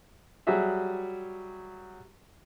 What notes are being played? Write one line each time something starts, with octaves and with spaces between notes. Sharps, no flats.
F#3 G3 F#4 G#4 E5